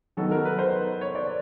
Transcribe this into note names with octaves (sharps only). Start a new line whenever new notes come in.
D#3 F#3 B3 A4
A#4
B4
C5
C#5
D5